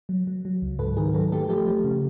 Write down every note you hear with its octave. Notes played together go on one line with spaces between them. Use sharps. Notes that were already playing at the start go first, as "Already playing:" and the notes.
F#3
F#3
F#3
C#2
G#2 A4 B4
D#3 G#4 A#4
F#3 A4 B4
A3 G4 A4
F3 G4 A4
F3
C#3